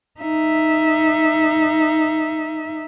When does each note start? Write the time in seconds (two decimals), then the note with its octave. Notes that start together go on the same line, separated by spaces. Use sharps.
0.20 D#4 E5